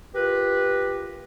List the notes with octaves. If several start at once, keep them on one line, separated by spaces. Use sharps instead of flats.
F4 G4 A#4 B4